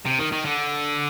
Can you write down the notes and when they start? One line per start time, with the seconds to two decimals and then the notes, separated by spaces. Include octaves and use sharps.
0.05 C3
0.19 D#3
0.32 D#3
0.45 D3